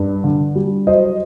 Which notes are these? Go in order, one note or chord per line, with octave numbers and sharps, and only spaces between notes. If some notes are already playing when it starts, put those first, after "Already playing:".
Already playing: G2
D3
G3
F#3 C5 D#5